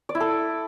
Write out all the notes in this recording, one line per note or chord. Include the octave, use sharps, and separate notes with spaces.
D5
E4
A4